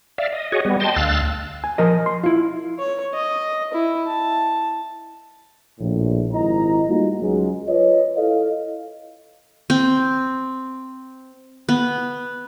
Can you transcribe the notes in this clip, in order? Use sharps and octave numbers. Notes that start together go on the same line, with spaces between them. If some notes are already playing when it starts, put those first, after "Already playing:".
D5 E5 F5
D#5
F#4 G#4 C#5 D#5
G3 B3
D#5 G5 A5 C6
D2 F5 E6 F#6 A6
G#5
F3 A#4 D#5
C6
E4 F4
C#5 C#6
D#5
E4
A5
A#1 A2
G#1 E4 D#5 A#5
G3 A3 A#3 D#4 F4 F#4
C#2 F#3 G#3
F4 B4 C#5 D#5
E4 A4 D#5 F5
C4
B3